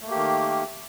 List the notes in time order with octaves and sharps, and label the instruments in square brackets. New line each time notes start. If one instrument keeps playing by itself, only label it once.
[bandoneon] A3
A#3
G4
D#3